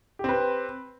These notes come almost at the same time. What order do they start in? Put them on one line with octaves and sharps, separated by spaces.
G4 C4 B4